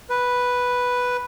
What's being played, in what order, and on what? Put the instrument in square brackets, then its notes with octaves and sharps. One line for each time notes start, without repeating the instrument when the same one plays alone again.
[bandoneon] B4